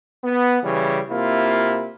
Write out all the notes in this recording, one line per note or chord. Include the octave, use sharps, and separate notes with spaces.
B3
C#3 E3 G3 C#4
C3 A#3 E4 F4